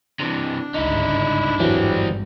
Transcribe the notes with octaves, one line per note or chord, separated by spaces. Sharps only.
C3 E3 D4
G1 C#2 G#2 D#4 E4
G#1 E2 G2 E3 F#3 G3 C4